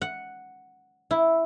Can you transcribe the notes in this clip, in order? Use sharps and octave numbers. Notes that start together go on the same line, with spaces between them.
F#5
E4